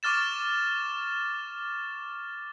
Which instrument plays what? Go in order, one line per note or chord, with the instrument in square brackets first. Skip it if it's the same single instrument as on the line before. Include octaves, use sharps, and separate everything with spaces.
[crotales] C#6 D6 F6 A6 E7